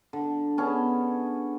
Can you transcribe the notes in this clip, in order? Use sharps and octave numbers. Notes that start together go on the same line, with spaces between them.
D3
B3 C#4 D4 G#4